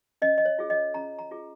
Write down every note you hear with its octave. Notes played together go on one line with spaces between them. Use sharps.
C#4 D#5
D#5
C#5
F4 G#4
D#5
C#4 A#5
A#5
F4 G#4